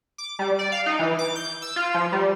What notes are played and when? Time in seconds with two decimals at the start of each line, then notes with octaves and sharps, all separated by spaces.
0.18 D6
0.39 G3
0.59 D5
0.72 F5
0.86 D#4
0.99 E3
1.19 D6
1.36 G6
1.62 E6
1.76 F4
1.95 F3
2.12 G3